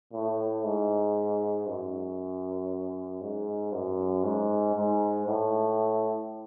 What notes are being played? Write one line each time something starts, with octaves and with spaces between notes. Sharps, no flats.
A2
G#2
F#2
G#2
F#2
G#2
G#2
A2